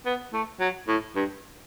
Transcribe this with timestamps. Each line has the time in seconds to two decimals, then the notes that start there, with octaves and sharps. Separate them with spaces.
0.06 B3
0.33 A3
0.60 F#3
0.88 A2
1.16 G2